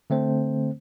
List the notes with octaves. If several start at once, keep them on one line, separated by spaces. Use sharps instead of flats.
D3 A3 C4 C5